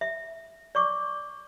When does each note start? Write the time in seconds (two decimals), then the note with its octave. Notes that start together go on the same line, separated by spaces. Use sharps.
0.01 E5
0.75 D5 C#6 D6